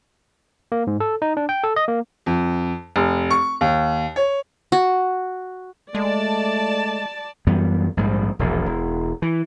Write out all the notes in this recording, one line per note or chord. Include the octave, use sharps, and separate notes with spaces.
A#3
G#2
A4
D#4
D4
G5
A4
D#5
A#3
F2
F1
C#6
D#2
C#5
F#4
G#3 A3 D5 A5
F#2 E3 G3 B3
A#1 G#2 G3
E1 A#1 E2
E1
E3